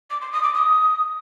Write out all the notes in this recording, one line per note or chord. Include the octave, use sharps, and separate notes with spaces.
D6
C6
D#6
D6
D#6